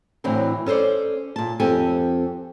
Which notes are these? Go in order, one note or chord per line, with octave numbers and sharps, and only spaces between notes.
A2 D3 E3 F#3 C4 D4
C#4 A4 A#4 C5 D5
A#2 A5
F2 C4 G4 A4 G#5